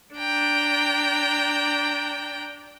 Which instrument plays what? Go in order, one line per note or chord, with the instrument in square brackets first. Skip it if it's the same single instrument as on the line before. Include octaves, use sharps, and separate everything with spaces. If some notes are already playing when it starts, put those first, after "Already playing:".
[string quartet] D4 G5 A#5